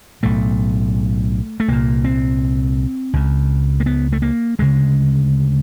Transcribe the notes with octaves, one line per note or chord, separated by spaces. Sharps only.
B1 A2 A3
A3
C2 A#2 A#3
C4
C#2 C#3
A#3
B3
A3
A#3
D2 C#3 G#3